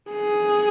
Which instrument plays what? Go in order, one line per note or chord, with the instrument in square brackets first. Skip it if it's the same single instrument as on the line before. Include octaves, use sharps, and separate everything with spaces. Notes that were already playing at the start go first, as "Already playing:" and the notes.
[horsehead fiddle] G#4